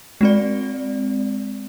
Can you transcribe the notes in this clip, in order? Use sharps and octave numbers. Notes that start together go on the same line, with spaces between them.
G#3 C4 D5